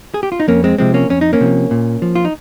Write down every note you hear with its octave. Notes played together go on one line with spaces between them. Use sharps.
G#4
G4
F4
D#4
F2 A#3 C#4
G#3 C4
C3 F3 G#3 C4
A#3 C#4
F2 C#4
D#4
A#3 C#4
C3 F3
A#2
F3
F4
D#4